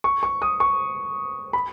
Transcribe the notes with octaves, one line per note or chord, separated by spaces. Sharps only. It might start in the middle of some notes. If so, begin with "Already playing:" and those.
C#6
C#6
D#6
C#6
B5